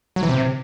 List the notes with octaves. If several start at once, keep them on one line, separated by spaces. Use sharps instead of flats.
F#3
E3
C3